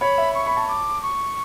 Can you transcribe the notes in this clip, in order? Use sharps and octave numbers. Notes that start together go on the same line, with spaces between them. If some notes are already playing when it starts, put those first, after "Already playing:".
C#5 B5
E5
B5 C#6
B5
A5
D6
C#6